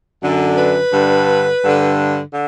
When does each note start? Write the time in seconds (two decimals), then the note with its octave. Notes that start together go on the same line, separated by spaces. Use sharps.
0.22 F#2 D3
0.57 B4
0.92 G2 D3
1.62 G2 D3
2.32 D3